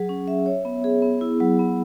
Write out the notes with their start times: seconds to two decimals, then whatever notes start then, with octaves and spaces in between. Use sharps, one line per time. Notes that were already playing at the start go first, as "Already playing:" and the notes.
Already playing: F#3 G#4
0.09 C#4
0.28 E5
0.46 C#5
0.65 B3
0.84 G#4
1.02 B3
1.21 E4
1.40 F#3
1.59 B3